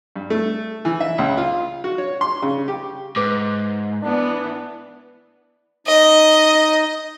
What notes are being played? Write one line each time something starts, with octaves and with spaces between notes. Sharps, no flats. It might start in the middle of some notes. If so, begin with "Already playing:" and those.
G2
A3
E3
E5
C#2
F4
F#4
C#5
C6
C#3
G4
G#2 B4 D6
E3 B3 D4
D#4 D#5